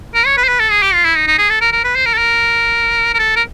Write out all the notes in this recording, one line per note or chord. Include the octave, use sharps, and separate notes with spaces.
A#4
C#5
B4
C5
B4
A4
G#4
G4
F4
E4
D#4
D#4
G#4
A4
A#4
A#4
B4
C5
A#4
A4
A#4
A#4
A4
A#4